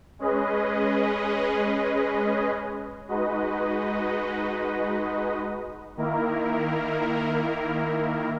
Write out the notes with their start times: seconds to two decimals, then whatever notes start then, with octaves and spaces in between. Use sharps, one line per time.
0.19 G#3 C#4 G#4 B4 D#5
3.08 G#3 D#4 F#4 B4 D#5
5.97 D#3 A#3 E4 A#4